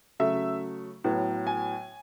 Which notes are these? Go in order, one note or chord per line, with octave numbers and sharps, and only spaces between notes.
C#3 F#3 A3 E5
A2 F#3 B3
G#5